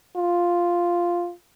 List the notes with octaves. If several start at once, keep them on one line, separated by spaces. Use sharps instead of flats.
F4